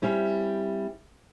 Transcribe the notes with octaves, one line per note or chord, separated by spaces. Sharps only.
G3 C4 C#4 E4